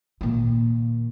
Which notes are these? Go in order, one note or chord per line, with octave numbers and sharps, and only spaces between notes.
A#2 D#3